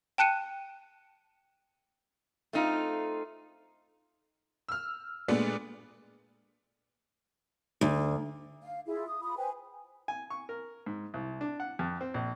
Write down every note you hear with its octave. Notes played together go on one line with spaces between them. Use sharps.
G5 A5 F#6 C#7 D#7
A3 C4 D#4 F4
E6 F6
A#2 G#3 A3 B3 D4
D2
F5
E4 F4 G#4
D#6
F4 B5 D#6
B4 C5 G5 G#5
G#5
C#6
A#4
G#2
C2
D4
F#5
F2
C4
A#1